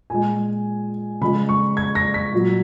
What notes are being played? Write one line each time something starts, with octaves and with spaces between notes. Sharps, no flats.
A#2 G#3 G#5
C#3 F3 G#3 B5
C#6
G#6
A#6
B6
A#2 F#3